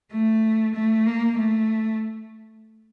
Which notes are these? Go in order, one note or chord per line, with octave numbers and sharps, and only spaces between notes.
A3
A3
A#3
A3